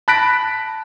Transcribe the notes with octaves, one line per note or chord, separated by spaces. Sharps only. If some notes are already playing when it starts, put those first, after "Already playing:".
A5 B5 F#6 A#6 B6 D7